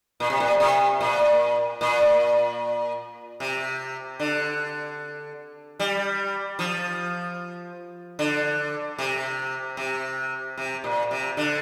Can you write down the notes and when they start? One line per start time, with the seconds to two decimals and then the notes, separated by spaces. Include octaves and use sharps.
0.20 A#2
0.30 C3
0.40 A#2
0.60 C3
1.01 A#2
1.81 A#2
3.40 C3
4.20 D3
5.79 G3
6.59 F3
8.19 D3
8.98 C3
9.77 C3
10.57 C3
10.84 A#2
11.11 C3
11.37 D3